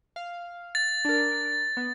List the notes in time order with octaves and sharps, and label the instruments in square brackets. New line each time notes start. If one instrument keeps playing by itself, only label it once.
[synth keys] F5
[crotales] A6
[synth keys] D4 A#4
B3